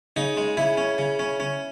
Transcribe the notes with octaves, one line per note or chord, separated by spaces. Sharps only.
C#3 D#4
G#3
C#3 E4
C#4
C#3
C#4
C#4